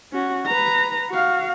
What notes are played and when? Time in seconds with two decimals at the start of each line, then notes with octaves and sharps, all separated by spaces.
0.12 C#4 F#4
0.46 B4 A#5
1.10 F#4 F5